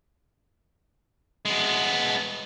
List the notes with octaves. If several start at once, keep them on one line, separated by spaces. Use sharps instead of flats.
G#3 B3